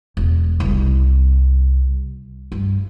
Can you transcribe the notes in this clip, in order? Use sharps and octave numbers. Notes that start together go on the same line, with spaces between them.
E1
C2
G2